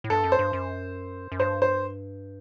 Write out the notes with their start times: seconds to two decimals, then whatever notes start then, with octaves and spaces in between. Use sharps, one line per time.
0.04 A2
0.10 G2 A4
0.24 F#2
0.32 C5
0.39 G2
0.53 F#2
1.32 F#2
1.40 G2 C5
1.62 C5